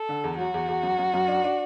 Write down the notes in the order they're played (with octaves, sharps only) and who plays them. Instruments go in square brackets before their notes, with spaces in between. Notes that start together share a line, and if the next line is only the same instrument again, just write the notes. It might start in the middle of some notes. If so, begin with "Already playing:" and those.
Already playing: [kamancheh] A4
[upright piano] D3
E2
[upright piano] F#3 [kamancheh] F#4
[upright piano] E2
E2
F#2
F#2
F#2
D4
D4